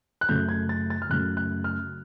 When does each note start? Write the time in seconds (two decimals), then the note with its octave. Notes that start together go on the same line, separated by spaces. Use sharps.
0.21 F#6
0.29 F#2 C#3 F#3 A3 G6
0.49 G#6
0.69 A6
0.90 A6
1.02 F6
1.10 F#2 C#3 F#3 A3 F#6
1.37 F#6
1.64 F6